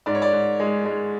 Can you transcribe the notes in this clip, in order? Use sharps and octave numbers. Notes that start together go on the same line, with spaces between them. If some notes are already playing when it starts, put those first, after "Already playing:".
G#2 D5
C#5
D5
G#2
G#3
G#3